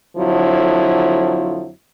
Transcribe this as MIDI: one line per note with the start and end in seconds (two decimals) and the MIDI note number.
0.17 1.70 41
0.17 1.70 50
0.17 1.70 53
0.17 1.70 54
0.17 1.70 64